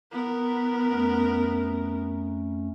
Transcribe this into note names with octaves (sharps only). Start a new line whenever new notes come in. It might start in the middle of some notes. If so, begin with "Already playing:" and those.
B3 A#4
F2 A3 C#4